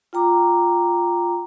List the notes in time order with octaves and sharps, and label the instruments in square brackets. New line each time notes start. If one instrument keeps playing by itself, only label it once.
[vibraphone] F4 G5 A#5 D6